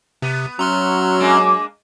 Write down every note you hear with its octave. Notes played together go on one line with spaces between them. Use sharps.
C3 B3
F#3 C#4 F#4 E5 A#5 C6 F6
G#3 A#3 D4